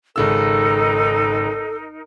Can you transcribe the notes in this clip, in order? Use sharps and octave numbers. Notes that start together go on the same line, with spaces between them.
G#1 C#3 D#4 A4 A#4 E6